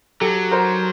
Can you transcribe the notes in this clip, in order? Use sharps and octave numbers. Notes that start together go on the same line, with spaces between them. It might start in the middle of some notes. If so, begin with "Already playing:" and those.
F#3 G4 A4
A#4 C5